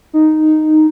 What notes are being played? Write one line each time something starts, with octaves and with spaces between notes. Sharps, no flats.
D#4